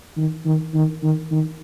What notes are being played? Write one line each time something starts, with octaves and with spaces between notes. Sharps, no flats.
D#3
D#3
D#3
D#3
D#3